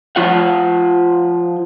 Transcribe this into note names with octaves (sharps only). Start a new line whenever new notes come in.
F3 F4 F#5